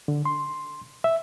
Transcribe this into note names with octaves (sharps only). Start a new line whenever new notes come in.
D3
C6
E5